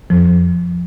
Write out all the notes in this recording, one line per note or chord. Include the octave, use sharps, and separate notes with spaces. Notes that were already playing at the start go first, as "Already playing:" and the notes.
F2 F3